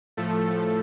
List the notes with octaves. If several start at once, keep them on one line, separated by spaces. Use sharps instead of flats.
A2 F3 A3 A4